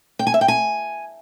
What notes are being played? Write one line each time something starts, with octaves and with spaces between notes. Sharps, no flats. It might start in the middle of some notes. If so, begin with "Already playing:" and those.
G5
G#5
E5
G5
G#5